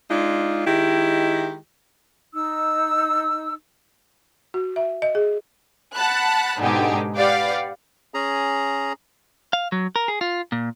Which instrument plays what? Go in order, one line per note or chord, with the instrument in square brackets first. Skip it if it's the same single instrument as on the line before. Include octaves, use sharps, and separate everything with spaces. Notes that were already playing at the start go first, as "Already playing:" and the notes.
[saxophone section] G#3 D4 D#4 F4
D#3 G#3 E4 G4
[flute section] D#4 E6
[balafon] F#4
E5
D#5
G#4
[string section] F#5 A5 B5 F#6
G#2 B2 D3 D#4 G4 G#4
G4 B4 D5 F5 F#5
[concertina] C#4 G#4 A#5
[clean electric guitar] F5
F#3
A#4
G#4
F4
A#2